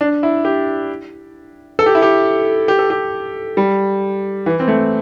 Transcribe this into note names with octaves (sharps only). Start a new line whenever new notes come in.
D4
E4
G4
A4
G4
E4
G4
G4
A4
G4
G3
E3
C4
A3